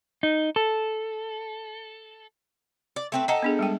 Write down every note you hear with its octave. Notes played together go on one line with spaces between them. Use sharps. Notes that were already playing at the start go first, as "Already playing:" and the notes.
D#4
A4
D5
A3 C4 B4
D#4 A4 D#5 F#5 A#5
B3 D4 G#4
G3 G#3 G5